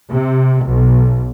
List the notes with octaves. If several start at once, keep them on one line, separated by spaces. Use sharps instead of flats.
C3
B1